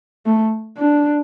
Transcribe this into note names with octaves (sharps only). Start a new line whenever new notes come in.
A3
D4